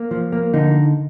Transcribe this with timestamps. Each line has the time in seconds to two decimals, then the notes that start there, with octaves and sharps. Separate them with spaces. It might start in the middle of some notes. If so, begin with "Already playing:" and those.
Already playing: A#3
0.11 F3
0.32 A#3
0.54 D3 D#4